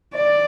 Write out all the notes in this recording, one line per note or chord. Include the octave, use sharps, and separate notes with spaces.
D5